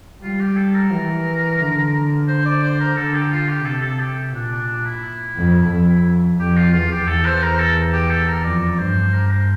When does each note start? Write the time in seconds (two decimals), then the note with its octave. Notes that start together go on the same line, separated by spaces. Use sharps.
0.23 G3 F4
0.40 G4
0.57 A4
0.74 A#4
0.91 E3
1.60 D3
2.28 C5
2.45 D5
2.63 C5
2.80 A#4
2.97 D3 A4
3.14 G4
3.31 F4
3.48 G4
3.65 C3 A4
3.82 A4
3.99 G4
4.33 A#2 D4
4.51 D4
4.67 D4
4.86 E4
5.36 F2
5.70 F2
6.40 F2 G4
6.56 F4
6.73 E2 F4
6.91 G4
7.07 E2 A4
7.25 C5
7.42 A#4
7.58 A4
7.93 G4
8.10 A4
8.28 A#4
8.44 F2 D5
8.78 G2 C5
9.13 A#4
9.31 C5